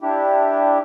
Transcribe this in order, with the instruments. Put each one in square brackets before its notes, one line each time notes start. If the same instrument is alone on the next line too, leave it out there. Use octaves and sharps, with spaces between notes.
[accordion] D4 E4 G4